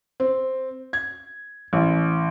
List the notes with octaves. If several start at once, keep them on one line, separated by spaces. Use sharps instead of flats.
C4
G#6
A1